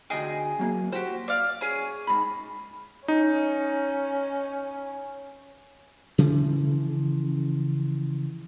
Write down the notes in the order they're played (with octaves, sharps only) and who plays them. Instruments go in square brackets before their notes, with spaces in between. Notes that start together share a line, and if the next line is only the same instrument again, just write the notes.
[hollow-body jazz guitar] D2 D#5 G5 [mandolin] G#4
[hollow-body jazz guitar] F#3 A#3
[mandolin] F#4 G4 [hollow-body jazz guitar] C5
[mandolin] D5 F5
C#4 G#4
[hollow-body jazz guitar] G#2 B5
[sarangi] C#4 [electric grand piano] D#4
[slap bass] C#3 E3 F3